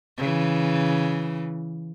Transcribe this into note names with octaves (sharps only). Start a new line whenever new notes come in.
C#3 E3